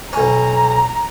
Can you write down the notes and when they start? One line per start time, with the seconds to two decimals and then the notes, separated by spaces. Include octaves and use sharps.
0.13 B1 C#4 A#5